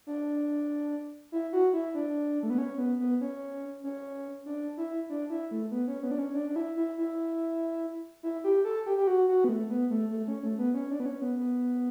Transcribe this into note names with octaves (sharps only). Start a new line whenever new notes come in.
D4
E4
F#4
E4
D4
A3
B3
C#4
B3
B3
C#4
C#4
D4
E4
D4
E4
A3
B3
C#4
B3
D4
C#4
D4
D4
E4
E4
E4
E4
G4
A4
G4
G4
F#4
F#4
B3
A3
B3
A3
A3
C#4
A3
B3
C#4
D4
B3
C#4
B3
B3